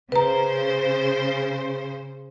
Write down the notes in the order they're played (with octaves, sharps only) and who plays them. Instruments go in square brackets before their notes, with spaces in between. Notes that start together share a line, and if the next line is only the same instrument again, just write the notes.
[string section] C#3 C5 [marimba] B4 A#5